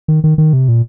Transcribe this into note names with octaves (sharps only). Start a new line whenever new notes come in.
D#3
D#3
D#3
C3
A#2